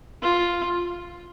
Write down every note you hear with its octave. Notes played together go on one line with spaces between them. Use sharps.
F4